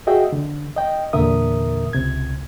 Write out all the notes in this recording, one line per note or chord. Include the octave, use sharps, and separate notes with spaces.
F#4 G#4 D#5 E5 G5
D3
D#5 G5
E2 A#2 D3 A#4 E5 D#6
C#2 C3 G#6